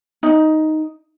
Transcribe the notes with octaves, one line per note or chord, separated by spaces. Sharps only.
D#4